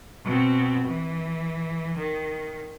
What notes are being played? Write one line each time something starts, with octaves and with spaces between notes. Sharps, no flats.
B2 C4
E3
D#3